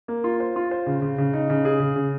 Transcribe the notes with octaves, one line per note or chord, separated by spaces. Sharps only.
A#3
F4
C5
F4
C5
C#3
C#3
C#3
D#4
C#3
G#4
C#3
C#3